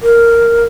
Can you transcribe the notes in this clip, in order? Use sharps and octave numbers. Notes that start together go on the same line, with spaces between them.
A#4